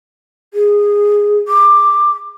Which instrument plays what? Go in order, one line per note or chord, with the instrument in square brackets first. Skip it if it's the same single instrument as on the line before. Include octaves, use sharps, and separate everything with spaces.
[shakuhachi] G#4
D6